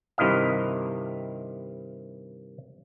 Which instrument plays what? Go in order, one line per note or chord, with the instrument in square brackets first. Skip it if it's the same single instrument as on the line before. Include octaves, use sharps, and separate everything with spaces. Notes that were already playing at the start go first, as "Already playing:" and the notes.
[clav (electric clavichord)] G2 C3 D#3 E4 D#5 F5